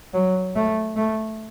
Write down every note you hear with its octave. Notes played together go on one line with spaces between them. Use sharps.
F#3
A3
A3